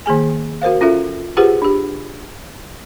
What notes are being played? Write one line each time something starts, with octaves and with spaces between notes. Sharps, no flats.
D#3 A#3 G#4 G#5
F#4 A#4 C5 F5
C#4 F4 A4 E5
F4 G4 G#4 B4 C5 F#5
D4 G4